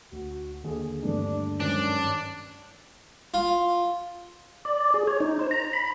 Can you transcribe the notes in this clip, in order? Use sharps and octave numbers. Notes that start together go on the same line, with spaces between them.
D2 F#4
D#2 D3 G#4
G2 A3 D4
G#2 D#3 F#3 C#4 D4
F4
D5
G#4
C#5
D#4
C5
A#5
B5